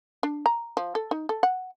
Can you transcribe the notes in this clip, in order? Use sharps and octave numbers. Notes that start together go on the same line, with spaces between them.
D4
A#5
F3
A4
D#4
A4
F#5